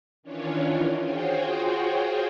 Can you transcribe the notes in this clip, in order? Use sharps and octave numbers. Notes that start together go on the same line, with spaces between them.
D#3 E3 C#4 D4 F4 C#5
F4 F#4 G#4 C5 C#5 G5